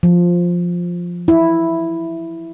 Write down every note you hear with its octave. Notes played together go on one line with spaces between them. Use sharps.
F3
E4